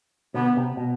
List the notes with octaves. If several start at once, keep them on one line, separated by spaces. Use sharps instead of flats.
B2 D3 B3
C3
B2